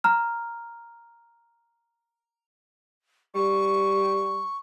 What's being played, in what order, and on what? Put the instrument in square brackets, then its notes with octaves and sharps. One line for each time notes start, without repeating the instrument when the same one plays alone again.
[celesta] A#5 F6
[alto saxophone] G3 [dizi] C#6